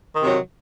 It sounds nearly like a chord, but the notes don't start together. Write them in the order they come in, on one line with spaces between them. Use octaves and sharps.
D#3 C3 F#3